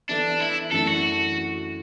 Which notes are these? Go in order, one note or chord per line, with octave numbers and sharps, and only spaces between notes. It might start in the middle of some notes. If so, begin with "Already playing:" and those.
E3 B3 D4 E4 A4 D5
E4
F#2 E3 A3 D4 A4
F#4